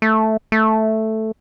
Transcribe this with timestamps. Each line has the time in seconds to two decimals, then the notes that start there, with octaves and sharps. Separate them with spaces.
0.02 A3
0.52 A3